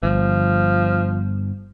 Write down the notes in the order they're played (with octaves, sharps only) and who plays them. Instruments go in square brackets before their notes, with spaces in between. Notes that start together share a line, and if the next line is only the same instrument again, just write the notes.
[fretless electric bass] G1 [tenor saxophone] F3